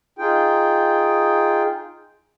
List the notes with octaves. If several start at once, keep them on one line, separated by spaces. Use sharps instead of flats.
D#4 F4 G#4 G5